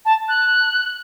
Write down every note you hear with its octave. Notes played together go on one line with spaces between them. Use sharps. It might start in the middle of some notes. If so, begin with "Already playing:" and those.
A5
F#6